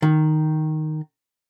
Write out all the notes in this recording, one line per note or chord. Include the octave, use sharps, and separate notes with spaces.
D#3